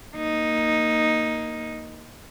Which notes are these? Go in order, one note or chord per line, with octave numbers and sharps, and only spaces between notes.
A#3 D#4